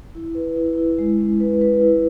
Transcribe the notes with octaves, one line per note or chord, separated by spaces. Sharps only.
E4
B4
E4
E4
G#3
C#4
B4
B4
E4